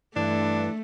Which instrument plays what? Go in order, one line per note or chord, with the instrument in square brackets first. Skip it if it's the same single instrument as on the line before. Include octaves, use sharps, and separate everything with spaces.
[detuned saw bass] G2 [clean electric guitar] E3 [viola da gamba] A3 [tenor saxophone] D4